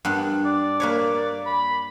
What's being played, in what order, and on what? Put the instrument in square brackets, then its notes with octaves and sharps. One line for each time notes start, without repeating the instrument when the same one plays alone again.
[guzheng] G2 B3 D4
[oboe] D5
[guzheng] A#3 B4 C#5
[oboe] B5